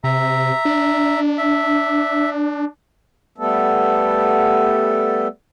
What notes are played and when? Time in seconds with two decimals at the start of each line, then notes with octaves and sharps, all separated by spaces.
0.04 C3 E5 A#5
0.65 D4
1.38 E5
3.38 G3 A3 B3 A4